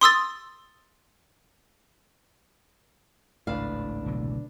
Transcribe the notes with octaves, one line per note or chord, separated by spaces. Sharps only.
C6 D#6 E6 A6
G#1 C#2 A2 D4 B4 F5
B2 D3 F#3